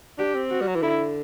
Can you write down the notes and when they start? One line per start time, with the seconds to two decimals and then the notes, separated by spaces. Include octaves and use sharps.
0.18 D4 G4
0.35 C4
0.50 F#4
0.61 G3
0.67 F#3
0.75 E3
0.82 D3 E4